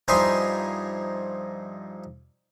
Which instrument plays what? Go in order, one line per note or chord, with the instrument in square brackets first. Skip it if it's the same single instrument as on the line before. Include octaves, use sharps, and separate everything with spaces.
[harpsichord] G2 F3 D#4 E4 G#5 C6